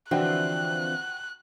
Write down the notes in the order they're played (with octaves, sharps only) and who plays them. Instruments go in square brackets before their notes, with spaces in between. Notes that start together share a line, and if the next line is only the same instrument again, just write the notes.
[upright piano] D3 D4 [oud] E3 F3 C4 [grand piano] F#4 G5 [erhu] F#6